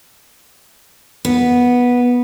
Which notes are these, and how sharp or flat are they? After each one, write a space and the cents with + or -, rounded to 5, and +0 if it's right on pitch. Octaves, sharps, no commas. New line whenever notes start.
B3 -10